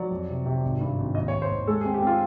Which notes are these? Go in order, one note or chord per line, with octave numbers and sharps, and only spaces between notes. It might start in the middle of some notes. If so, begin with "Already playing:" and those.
Already playing: F#3 D5
F2
C3
C3
G#1
G2
G#1
D#2 D#5
C#5
D#2
C5
D#2
G#3 A4
G#4
C4
G4
C4 F4